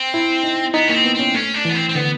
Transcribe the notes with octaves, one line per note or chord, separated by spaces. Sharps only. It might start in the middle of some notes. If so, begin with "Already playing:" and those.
Already playing: C4
E4
D#4
B3 D#4
A#3 C#4
C4
B3
C4 C#4
A3 C#4
D4
E3
B3
C4
C4
D3 B3